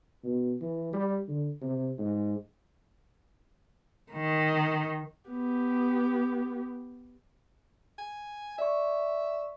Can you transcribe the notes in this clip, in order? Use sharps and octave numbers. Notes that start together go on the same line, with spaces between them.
B2
E3
G3
D3
C3
G#2
D#3
B3 G4
G#5
D5 E5 C#6